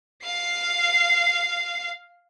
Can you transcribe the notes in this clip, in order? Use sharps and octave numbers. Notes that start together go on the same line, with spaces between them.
F5 C7